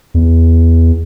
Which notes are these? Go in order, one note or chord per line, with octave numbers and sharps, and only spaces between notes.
E2